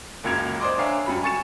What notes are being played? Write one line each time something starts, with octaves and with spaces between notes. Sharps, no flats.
F#1 C#2 F#2 A#3 G#6 F7
C5 D5 D#5 C6 D6
D4 A#4 C#5 E5 F5 G#5
F#2 G3 B5
G#5 C#6 A6 C#7 E7